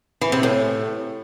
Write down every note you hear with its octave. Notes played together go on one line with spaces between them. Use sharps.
E3
C3
A2